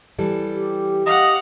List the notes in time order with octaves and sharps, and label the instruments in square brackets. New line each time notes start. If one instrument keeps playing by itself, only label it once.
[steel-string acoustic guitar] E3 G3 A4
[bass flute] G4
[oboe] D#5 [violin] F5 F#5